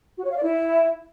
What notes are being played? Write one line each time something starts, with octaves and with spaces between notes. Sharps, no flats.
F#4
C#5
F5
D5
E4